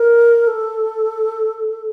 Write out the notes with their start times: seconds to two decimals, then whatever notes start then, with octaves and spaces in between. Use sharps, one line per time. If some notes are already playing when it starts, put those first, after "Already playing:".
Already playing: A#4
0.47 A4